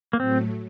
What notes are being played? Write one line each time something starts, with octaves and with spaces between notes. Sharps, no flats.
A#3
A2 F#3 A3 C4